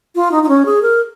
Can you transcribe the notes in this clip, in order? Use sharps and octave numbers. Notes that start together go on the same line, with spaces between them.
F4
D#4
D#4
C#4
G#4
A#4